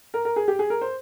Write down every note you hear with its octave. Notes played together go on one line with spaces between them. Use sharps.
A#4
A#4
G#4
G4
G#4
A#4
C5